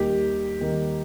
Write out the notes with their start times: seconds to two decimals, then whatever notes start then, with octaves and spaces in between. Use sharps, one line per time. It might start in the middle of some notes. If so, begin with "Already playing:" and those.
Already playing: D#2 D#3 G3 A#3 G4
0.60 D#2 D#3 G3 A#3